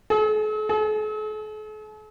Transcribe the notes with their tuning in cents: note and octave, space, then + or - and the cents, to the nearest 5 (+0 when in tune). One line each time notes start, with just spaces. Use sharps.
A4 -45
A4 -45